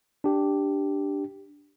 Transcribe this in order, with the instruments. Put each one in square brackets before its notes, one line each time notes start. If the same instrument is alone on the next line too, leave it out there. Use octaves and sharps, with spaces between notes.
[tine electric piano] D4 G4